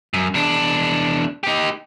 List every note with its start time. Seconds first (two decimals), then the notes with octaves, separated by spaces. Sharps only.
0.14 F#2
0.34 E2 D4
1.43 D#4 G4